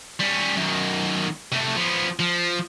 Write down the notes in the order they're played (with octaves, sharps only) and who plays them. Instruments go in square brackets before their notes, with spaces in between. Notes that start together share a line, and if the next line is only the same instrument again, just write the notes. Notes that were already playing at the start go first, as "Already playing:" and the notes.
[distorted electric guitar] G3 C#4
F#2 D#3
C3 A3
F3 B3
F3